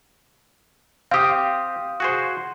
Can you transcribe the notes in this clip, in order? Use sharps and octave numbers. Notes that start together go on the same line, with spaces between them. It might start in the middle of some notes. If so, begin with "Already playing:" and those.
C4 G4 F5 D#6
F#4 G#4 C5